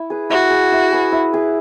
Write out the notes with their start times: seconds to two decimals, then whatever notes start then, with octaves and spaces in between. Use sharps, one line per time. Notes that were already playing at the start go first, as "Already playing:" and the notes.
Already playing: E4
0.10 G#4 B4
0.30 E4 F#4
0.50 G#4 B4
0.72 E4
0.92 G#4 B4
1.12 E4
1.33 G#4 B4